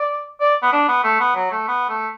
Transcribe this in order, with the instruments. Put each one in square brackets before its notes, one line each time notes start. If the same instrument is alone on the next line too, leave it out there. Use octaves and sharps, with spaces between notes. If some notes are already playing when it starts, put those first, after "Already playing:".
Already playing: [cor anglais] D5
D5
B3
D4
B3
A3
B3
F#3
A3
B3
A3